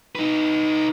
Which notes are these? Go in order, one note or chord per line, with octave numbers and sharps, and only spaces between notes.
D#4 B4